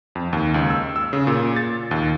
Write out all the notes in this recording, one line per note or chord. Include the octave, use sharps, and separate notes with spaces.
F2
D#2
C#2
E6
E6
C#3
A#2
A6
D#2